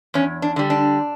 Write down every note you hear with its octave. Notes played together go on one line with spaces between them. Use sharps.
E2 C#4
D4
D3 G3
D4